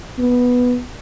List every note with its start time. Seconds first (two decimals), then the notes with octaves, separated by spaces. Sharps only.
0.19 B3